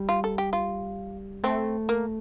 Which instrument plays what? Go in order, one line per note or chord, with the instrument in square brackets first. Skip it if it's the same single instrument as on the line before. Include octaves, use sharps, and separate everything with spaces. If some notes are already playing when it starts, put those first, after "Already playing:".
Already playing: [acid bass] G3
[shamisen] F4
A4
G4
F4
[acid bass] A3 [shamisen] C4
[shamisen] A#3